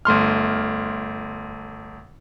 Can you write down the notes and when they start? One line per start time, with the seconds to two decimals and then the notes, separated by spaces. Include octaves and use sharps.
0.05 G1 A3 C6 F6